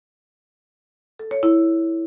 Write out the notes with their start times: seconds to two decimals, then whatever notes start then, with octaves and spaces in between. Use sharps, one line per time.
1.19 A4
1.31 C#5
1.43 E4